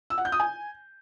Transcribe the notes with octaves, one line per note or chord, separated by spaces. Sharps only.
E6
F#5
G6
D#6
G#5